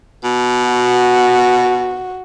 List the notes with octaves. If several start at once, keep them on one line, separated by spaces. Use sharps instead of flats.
B2
F#4